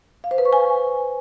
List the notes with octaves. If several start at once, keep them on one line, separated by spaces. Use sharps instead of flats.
F5
C5
B4
C#6
G#5